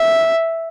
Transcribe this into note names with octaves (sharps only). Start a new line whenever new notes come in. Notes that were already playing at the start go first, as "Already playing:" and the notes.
Already playing: E5